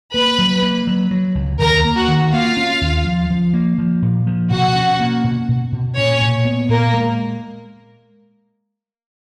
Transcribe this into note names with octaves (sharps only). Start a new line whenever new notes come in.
A#3 B4 B5
F#3
A#3
F#3
F#3
C#2
D#2 A#4 A#5
A#3
F#4 F#5
D#3
A#3 F4 F5
C#4
D#2
F3
F3
A#3
F3
A#2
F3
B2 F#4 F#5
C#4
A#3
B2
B2
B2
A#2 C#4 C#5
A#2
B3
A#2 A#3 A#4
G#3